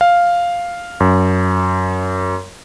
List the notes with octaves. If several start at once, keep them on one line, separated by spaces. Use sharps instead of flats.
F5
F#2